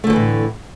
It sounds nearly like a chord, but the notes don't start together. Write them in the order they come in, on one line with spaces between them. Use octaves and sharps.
A3 D3 F3 E3 A2